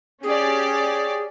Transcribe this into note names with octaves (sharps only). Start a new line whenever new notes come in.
C#4 G4 G#4 D5